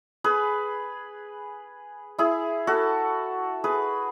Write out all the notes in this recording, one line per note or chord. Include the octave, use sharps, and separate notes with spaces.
G#4 B4
E4 G#4
F#4 A4
G#4 B4